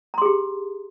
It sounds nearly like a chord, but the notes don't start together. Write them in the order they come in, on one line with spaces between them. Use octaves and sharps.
A#5 C6 G#4 G4